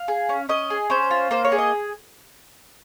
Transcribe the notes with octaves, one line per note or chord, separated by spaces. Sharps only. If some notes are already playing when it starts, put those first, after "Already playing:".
Already playing: F5
G#4
C#4
C#4 D#5
G#4
C#4 C5
F4
A#3 C5
C#5
G#4
D#5